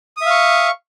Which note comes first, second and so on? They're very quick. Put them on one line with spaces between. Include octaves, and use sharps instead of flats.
D#6 E5 F5 C#6